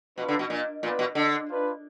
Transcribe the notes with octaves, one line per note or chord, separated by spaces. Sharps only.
B2 D4 F4 B4
D3
B2
A#2
A#2 B3 F4 B4 D5
B2
D3
D4 F4 B4